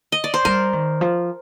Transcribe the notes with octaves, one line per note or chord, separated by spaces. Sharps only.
D#5
D5
C5
G3 A#4
D#3
F3